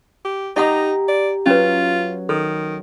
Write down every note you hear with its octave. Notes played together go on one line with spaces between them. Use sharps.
G4
D#4 G4 D#5 F#5 A#5 D#6
D5
F#3 C#4 F4 B4
D#3 A4